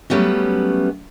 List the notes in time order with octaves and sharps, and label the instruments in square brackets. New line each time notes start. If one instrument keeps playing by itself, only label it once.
[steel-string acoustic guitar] F#3 G3 A3 B3 C#4